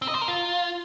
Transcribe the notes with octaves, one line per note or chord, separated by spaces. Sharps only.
C4
D#5
C5
A#4
F4